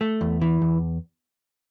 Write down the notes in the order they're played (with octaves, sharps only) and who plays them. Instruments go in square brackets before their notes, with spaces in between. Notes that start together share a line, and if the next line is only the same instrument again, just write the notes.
[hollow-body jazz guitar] A3
E2
E3
E2